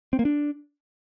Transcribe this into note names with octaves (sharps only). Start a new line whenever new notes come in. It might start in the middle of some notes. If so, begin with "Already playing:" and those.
C4
A#3
D4